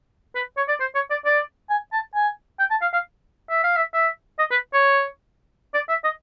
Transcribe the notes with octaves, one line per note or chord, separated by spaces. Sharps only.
B4
C#5
D5
C5
C#5
D5
D5
G#5
A5
G#5
G5
A5
F5
F5
E5
F5
E5
E5
D#5
B4
C#5
D5
E5
D#5